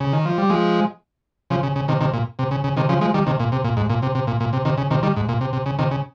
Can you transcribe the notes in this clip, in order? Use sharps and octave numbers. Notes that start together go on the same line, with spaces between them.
C#3
D#3
F3
G3
F3 G#3
C#3 F3
C#3
C#3
C3 D#3
C3 D#3
A#2
C3
C#3
C#3
C3 D#3
C#3 F3
F3 G#3
D#3 G3
C3 D#3
A#2
C3
A#2
G#2
A#2
C3
C3
A#2
A#2
C3
C3 D#3
C#3
C3 D#3
D#3 G3
G#2
A#2
C3
C3
C#3
C3 D#3
C#3